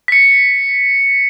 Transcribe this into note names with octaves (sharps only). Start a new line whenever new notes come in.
B6 C#7